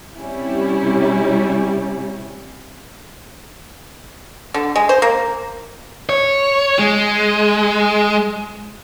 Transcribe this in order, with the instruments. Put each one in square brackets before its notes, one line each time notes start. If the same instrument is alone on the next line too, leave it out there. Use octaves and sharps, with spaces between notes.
[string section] C3 G3 C#4 E4
[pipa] D3
G#3
C5
A#3
[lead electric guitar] C#5
G#3